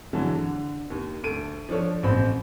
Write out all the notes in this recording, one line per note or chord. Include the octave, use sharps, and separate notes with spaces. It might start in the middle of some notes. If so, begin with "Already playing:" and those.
D3 E3 F#3 G#3 A5
D3
D#2
D2 A4 D7 D#7
F3 D4 A4 C#5
A1 B2 C4 C5 B5